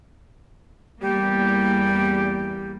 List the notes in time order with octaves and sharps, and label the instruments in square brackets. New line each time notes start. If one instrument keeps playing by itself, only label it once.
[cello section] E2 G3 A#3 [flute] G4